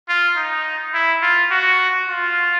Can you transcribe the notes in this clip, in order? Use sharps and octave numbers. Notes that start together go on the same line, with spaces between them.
F4
D#4
E4
F4
F#4
F4